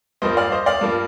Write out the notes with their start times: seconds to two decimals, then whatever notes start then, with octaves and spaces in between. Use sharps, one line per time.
0.22 G2 F3 A#3 C5 D#5
0.37 D5 F5
0.52 C5 D#5
0.66 D5 F5
0.81 G2 F3 A#3